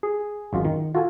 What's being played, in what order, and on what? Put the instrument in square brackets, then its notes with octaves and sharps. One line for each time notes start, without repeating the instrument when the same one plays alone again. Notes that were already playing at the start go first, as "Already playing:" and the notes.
[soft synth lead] G#4
[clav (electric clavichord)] G#1 F#2 F4
D#3
[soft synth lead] F4 [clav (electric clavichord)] F#4 A4 G#5